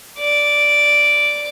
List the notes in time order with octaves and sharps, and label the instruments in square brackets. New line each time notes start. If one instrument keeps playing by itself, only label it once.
[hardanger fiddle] D5